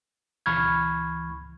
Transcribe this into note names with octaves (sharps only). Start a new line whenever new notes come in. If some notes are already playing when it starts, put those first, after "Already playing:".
C#2 E3 B5 C#6 F6 G#6